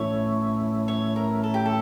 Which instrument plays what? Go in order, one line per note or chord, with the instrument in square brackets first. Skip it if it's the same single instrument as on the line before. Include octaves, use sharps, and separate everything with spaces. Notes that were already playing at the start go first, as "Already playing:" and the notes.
Already playing: [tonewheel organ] A2 E3 A3 C#4 E4 [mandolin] C#5
[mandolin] C#5
A#4
A4
G4
A4